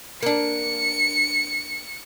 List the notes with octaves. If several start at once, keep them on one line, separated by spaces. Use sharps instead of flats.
A#3 D4 C#7